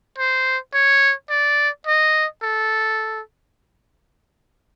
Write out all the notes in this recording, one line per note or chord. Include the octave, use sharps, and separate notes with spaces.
C5
C#5
D5
D#5
A4